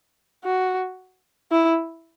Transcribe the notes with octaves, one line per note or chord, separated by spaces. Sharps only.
F#4
E4